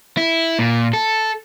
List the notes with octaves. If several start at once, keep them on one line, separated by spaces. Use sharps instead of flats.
E4
A#2
A4